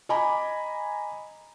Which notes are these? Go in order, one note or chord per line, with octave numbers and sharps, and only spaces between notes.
D#5 G#5 A#5 B5 D6